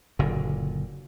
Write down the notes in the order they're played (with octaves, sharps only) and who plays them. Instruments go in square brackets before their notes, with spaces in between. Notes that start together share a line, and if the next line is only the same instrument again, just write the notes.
[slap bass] F#1 A#2 D3